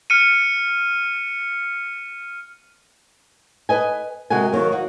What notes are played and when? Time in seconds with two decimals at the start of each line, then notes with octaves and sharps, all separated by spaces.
0.10 F6 C#7 D#7
3.69 B4 D#5 G#5
4.30 C3 G#3 F#4 A#4 G#5
4.52 D#3 F#3 A#3
4.71 A#3 D#4 F#4